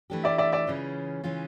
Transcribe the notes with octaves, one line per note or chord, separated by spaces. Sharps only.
E3 A3 D4 G4
D5 E5
D5 E5
D5 E5
C#3 E3 G#3 C#4 F4
C#3 E3 G#3 C#4 F4